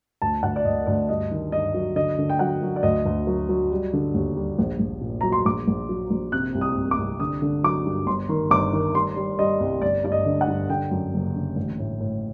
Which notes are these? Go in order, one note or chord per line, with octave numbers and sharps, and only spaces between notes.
D2 A5
D2 F#5
D5
D2 D#5
D2 D5
G2 D#5
D#3
G2 D#5
F#3
D3 D#5
D3
G5
F#3 F#5
F#3
D5
D2 D#5
D2
F#3
F#3
G3
D3
D#2
G3
A#1
A#1
A#2
F#3 A#5
C6
A#1 D6
A#1
F#3
A#1
C3 F#6
C2
D#6
C2
D6
C2
D3 D#6
D3
F#3 D6
G2
G1 C6
D#3
G1 D6
D#3
G3 C6
G3
G3 D#5
C2
G1 D5
G2 D5
D#5
D3
F#5
G2
D3 G5
F#2
F#1
D3
A1
A2
A2